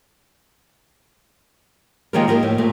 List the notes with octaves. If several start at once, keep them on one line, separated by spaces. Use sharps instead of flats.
D#3 F3 G#3 A#3 G4 A#4
A#3 G4 A#4 D#5
A2
A#2 A3